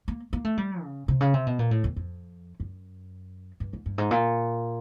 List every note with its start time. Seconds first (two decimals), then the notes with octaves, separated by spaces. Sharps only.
0.08 A#3
0.33 A#3
0.44 A3
0.57 G3
0.83 C#3
1.08 C3
1.21 C#3
1.34 C3
1.47 B2
1.59 A#2
1.71 A2
1.84 E2
1.96 F2
2.60 F#2
3.60 G2
3.73 G#2
3.86 G2
3.98 G#2
4.11 A#2